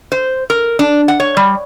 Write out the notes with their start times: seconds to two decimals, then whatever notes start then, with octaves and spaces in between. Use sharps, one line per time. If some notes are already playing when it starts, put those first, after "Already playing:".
0.12 C5
0.50 A#4
0.79 D4
1.08 F#5
1.20 C#5
1.37 G3